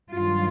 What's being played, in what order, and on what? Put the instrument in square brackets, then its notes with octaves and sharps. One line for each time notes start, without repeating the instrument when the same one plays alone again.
[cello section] G2 D#3 F#3 F4